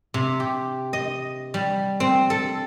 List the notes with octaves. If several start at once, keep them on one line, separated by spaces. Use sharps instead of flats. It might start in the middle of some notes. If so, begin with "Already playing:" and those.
C3
G4
D#5
G3
C4
A4